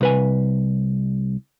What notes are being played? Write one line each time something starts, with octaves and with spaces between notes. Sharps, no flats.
C2 B4 G#5